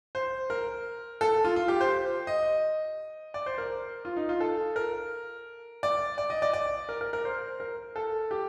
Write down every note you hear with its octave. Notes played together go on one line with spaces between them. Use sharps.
C5
A#4
A4
F4
F4
G4
C5
D#5
D5
C5
A#4
F4
D#4
F4
A4
A#4
D5
D5
D#5
D5
D5
A#4
A#4
A#4
C5
A#4
A4
G4